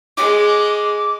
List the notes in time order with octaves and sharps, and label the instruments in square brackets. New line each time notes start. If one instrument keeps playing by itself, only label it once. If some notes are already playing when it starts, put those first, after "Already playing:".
[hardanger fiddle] G#3 [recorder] D6